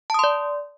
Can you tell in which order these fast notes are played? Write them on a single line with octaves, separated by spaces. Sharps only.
A5 D#6 C6 D5